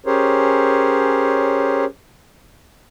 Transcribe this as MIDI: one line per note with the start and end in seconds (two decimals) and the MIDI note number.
0.06 1.85 61
0.06 1.85 67
0.06 1.85 68
0.06 1.85 70
0.06 1.85 72
0.06 1.85 73